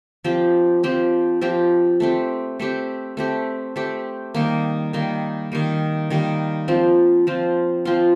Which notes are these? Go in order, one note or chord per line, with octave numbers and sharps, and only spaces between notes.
F3 C4 G4
F3 C4 G4
F3 C4 G4
A3 C4 G4
A3 C4 G4
A3 C4 G4
A3 C4 G4
D#3 G3 A#3
D#3 G3 A#3
D#3 G3 A#3
D#3 G3 A#3
F3 C4 F4
F3 C4 F4
F3 C4 F4